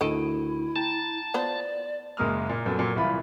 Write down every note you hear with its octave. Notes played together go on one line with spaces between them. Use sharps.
D2 D#3 E4 A4 D#5 D7 D#7
G5 A5 A#5
B3 F4 C5 D5
F#1 G#3 A#3 D#6 F6
A#2
F#2 A#2 B3 A4
A#2 F#3
C2 E3 F4 B5